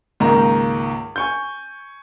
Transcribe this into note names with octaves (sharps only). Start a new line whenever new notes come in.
C#2 G#2 D#3 A#3 A#5
G#5 C#6 G6